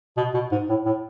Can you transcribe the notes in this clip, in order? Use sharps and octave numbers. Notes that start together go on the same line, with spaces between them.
B2
B2
G#2
A2
A2